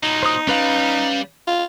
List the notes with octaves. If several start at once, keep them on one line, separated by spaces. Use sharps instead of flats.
A#2 F#3 D#4
C5 D#6
G3 C#4 B4 F5
F4